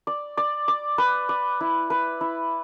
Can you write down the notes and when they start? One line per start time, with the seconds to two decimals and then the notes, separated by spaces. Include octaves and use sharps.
0.07 D5
0.37 D5
0.68 D5
0.98 B4
1.29 D5
1.61 E4
1.90 B4
2.21 E4